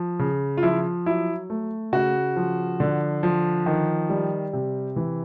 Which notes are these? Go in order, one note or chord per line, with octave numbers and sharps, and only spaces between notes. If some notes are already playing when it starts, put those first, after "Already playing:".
Already playing: F3
C#3
F4
F3 E4
F#3 E4
A3
C#3 F#4
F3
D3
F3
D#3
G3
C3
E3